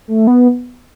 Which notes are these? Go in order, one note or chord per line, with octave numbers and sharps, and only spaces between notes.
A3
B3